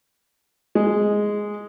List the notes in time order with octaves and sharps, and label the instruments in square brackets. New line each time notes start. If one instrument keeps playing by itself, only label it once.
[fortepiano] G#3